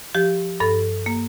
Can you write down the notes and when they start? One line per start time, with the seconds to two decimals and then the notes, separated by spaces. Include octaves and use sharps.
0.15 F3 G4
0.60 G2 A4
1.06 A#3